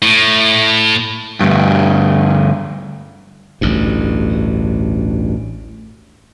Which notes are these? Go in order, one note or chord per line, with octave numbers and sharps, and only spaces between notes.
A2
D2 G2
A1 D2 G2